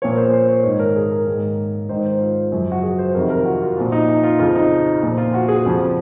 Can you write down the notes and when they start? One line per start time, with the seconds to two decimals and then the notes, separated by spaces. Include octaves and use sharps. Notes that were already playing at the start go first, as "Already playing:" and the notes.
0.02 A#2 F3 C#5
0.12 A#4
0.17 C5
0.33 C5
0.48 C#5
0.64 G#2 D#3 C#5
0.79 A#4
0.96 G#4
1.12 A#4
1.26 G#2 D#3
1.89 G#2 D#3 C5
2.05 C5
2.21 F4
2.52 F#2 C#3 F3
2.72 F#4
2.83 G#4
2.99 C5
3.15 F2 C3 D#3 A#4
3.30 A#4
3.39 F4
3.46 F#4
3.61 F4
3.77 A#2 F3 F4
3.92 D#4
4.09 D#4
4.23 F4
4.39 F2 C#3 F3 F4
4.55 D#4
5.03 A#2 F3
5.18 F4
5.34 F#4
5.48 G#4
5.65 F2 C#3 F3